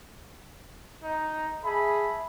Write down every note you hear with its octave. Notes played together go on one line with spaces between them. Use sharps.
D#4
G#4 E5 A5 B5